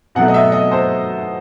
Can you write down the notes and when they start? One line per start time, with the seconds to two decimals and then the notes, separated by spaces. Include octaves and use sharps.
0.15 B2 F#3 A3 F#5
0.28 D#5
0.34 E5
0.52 D#5
0.71 C5